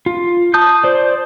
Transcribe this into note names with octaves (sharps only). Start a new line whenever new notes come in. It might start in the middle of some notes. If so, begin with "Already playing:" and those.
F4
A5 D#6 G6
C5 D5